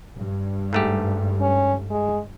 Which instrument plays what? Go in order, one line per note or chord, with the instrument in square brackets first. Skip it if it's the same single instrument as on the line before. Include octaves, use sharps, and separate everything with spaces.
[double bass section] G2
[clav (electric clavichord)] G#2 A3 G4
[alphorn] C#4
G#3